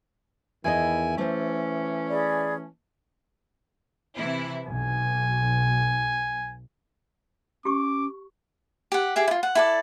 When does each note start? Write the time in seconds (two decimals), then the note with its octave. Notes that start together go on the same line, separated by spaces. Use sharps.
0.64 E2 D#3 E4 G#4 D#5 G#5
1.18 E3 A3 C#4 C5
2.10 G#4 D5 B5
4.16 C3 E3 E4
4.64 B1 G#5
7.65 C#4 G4 C#6 D6
8.92 G4 F#5
9.16 G4 G#4 E5
9.28 E4 F4
9.43 F#5
9.55 E4 A4 D5